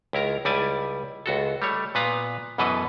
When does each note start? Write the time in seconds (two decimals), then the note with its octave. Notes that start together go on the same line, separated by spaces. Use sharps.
0.13 C#2 E4 A#4 A#5
0.45 C#2 G3 E4 D5 G#5 A5
1.26 C#2 F#4 A4
1.62 G3 A3 C#5
1.95 A#2 B3 B4 F5 A#5
2.58 F#2 B2 E3 A4 B4 D#5